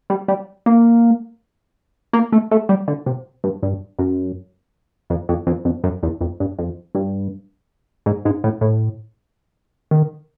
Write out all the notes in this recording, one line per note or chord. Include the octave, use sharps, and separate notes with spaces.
G3
G3
A#3
A#3
A3
A3
G3
D3
C3
G2
G2
F#2
F2
F2
F2
F2
F#2
E2
F2
G2
F2
G2
G#2
G#2
A2
A2
D#3